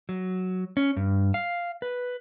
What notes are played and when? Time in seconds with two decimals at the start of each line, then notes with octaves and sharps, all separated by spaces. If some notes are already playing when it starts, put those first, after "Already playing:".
0.09 F#3
0.77 C#4
0.96 G2
1.34 F5
1.82 B4